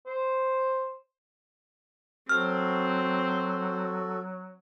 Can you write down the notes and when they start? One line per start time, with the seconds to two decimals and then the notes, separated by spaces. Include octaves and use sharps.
0.06 C5
2.29 F#3 C4 F#4 A4 F6